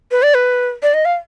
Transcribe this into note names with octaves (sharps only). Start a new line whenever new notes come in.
B4
D5
B4
D5
D#5
F5